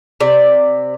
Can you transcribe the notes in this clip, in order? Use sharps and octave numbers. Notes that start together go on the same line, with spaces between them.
C3 D5